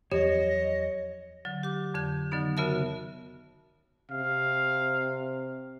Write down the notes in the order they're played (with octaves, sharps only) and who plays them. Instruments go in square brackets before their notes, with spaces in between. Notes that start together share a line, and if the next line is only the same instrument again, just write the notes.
[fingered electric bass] E2 F3 F#3 [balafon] G4 [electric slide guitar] C#5 [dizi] D#5
[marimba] D3 F#3
G4 D6
F2 D3 G6
D3 D#3 F#3 B3 D#4
C#3 B3 F#4 A#4 E5 A5
[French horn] C3 [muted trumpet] F5